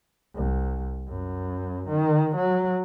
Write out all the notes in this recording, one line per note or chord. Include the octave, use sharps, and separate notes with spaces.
C2
F#2
D#3
F#3